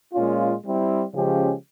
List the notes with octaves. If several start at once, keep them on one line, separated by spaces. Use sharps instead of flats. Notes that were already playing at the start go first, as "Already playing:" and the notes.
A#2 G#3 C#4 F4
G3 C4 E4
C#3 F3 G#3 C#4 G4